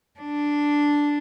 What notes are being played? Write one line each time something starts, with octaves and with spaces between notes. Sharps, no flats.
D4